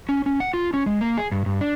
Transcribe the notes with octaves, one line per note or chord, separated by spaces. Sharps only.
C#4
C#4
F#5
F4
C#4
G#3
A#3
G#4
G2
G2
D4